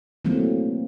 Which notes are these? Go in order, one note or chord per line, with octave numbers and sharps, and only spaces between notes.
E3 F#3 A3 A#3 C4